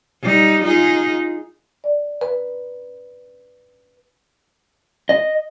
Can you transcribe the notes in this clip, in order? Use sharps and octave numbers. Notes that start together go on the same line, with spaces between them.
G3 D#4
D#4 F4 G#4
D5
B4
D#5